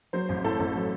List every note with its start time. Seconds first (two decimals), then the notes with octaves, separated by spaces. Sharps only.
0.13 F#3 C5
0.29 A1
0.44 A2 A4
0.60 A1 A4
0.75 F#3